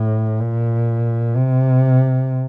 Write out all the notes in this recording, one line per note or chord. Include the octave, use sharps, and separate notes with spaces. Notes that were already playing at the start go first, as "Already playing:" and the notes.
Already playing: A2
A#2
C3